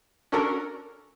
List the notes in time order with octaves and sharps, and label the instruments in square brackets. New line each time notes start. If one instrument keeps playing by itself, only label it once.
[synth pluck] C#4 D4 F#4 A4 A#4